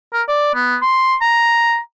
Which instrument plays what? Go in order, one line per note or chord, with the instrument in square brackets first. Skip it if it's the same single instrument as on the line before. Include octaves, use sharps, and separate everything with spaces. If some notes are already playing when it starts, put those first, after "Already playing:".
[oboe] A#4
D5
B3
C6
A#5